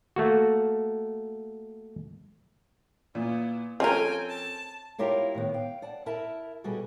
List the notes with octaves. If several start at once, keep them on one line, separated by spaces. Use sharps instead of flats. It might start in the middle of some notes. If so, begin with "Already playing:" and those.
A3 A#3 F#4
A#2 B3 E4
F3 C4 C#4 A4 A#4 G5 G#5
A5
E4 F4 G4 A#4 C#5 F5
A2 D#3 B3
F5 G5
D5 F#5 A5
E4 A#4 E5 A5
B2 G3 F#4 G#4 A4